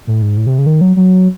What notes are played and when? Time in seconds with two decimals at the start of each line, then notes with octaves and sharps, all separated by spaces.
0.07 A2
0.22 G#2
0.37 A2
0.47 C3
0.58 C#3
0.66 D#3
0.81 F#3
0.97 F#3